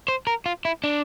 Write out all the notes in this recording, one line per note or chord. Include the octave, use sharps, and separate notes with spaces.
C5
A#4
F4
E4
D4